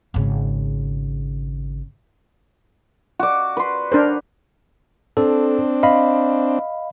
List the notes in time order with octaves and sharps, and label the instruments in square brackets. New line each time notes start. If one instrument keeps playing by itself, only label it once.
[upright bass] G#1 C#3
[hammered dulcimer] F#4 D5
B4 C6
[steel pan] D4 A#4 C5
[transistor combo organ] C4 D4 [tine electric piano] A4
[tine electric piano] D#5 F5 B5